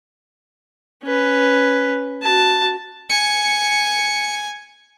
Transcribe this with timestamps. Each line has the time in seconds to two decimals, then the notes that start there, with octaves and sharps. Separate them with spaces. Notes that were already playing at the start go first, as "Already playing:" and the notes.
1.04 C#4 B4
2.22 F#4 A5
3.10 G#5 C#7